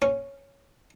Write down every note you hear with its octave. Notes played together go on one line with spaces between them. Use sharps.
C#4